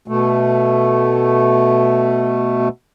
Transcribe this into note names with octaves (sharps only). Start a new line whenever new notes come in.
B2 A3